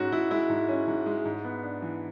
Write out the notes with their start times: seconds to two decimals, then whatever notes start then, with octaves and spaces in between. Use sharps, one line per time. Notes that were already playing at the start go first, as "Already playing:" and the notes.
Already playing: G#2 C#4 F#4
0.12 G#2 E4
0.31 G#3 E4
0.50 G#2
0.69 C#4
0.88 G#2
1.06 G#3
1.25 G#2
1.44 B3
1.63 D4
1.82 E3